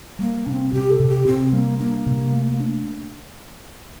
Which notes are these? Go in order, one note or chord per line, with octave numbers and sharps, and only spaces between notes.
G3 A#3
C3 C4 D4
C3 G4
A4
C3
G4
C3 C4
G3 A#3
A#3 D4
C3
A3
D4